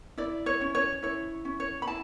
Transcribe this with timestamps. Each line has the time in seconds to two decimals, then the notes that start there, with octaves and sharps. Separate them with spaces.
0.18 E4 D5
0.46 C#5
0.61 C#4
0.75 C#5
1.03 E4 C#5
1.45 C#4
1.60 C#5
1.82 B5
1.87 E4 A5